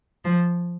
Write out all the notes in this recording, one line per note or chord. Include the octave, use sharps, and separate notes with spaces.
F3